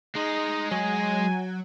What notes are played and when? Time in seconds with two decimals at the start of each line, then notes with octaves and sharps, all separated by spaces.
0.16 G#3 D#4
0.71 F#3 G#5